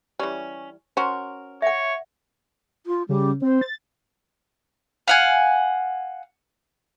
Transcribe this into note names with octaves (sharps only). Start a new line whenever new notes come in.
E3 G3 C#4
C#4 F#4 A#4 C5
C#5 E5 F#5
F4
C#3 G3
C4 C5
A6
F5 F#5 G#5